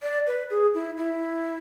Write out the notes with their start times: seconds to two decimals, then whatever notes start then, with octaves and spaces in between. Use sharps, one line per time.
0.03 D5
0.27 B4
0.50 G#4
0.74 E4
0.97 E4